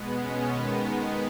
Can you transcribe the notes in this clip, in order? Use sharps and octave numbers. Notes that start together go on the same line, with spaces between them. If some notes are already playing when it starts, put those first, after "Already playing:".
Already playing: B2 G#3 B3
C#4
D#3 G#3 B3